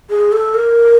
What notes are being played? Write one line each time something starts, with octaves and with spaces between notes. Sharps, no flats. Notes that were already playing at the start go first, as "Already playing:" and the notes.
G#4
A4
A#4